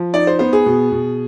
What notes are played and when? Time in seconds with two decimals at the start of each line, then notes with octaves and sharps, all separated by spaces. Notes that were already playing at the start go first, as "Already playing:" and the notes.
Already playing: F3
0.14 D#4 D5
0.27 C5
0.39 B3 C5
0.53 G#4
0.66 B2
0.92 B2